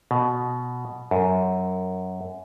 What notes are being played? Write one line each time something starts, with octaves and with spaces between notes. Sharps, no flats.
B2
F#2